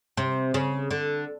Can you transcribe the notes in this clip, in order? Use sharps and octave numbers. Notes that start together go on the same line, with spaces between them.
C3
C#3
D3